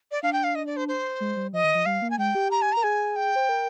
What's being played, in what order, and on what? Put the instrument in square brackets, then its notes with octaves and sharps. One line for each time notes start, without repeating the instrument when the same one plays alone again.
[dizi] D5
[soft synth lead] D4 [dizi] F5
[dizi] G5
F5
D#5
D5
C5
C5
[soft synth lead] G#3
G3
[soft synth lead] F3 [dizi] D#5
[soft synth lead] D#3
F3
[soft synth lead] G3 [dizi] F5
[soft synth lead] A#3
[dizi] G#5
[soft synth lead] G#3 [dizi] G5
[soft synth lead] G4
[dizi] A#5
G#5
[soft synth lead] A#4 [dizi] A#5
[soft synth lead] G#4 [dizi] G#5
[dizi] G5
[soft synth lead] C5
A#4